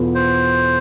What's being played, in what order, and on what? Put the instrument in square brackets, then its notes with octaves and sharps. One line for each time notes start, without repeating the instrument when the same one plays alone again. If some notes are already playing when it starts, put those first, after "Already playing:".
Already playing: [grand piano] E2 B2 B3 F4 A4
[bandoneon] C5